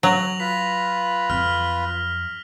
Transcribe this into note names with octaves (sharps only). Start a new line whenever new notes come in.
F#3 A#6 F7 F#7
F4 B4 B5 B6
F2 F6